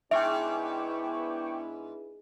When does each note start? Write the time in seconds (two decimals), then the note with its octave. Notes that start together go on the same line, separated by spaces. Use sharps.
0.11 G#2 B3 D4 E4 E5 G5 C#6 D6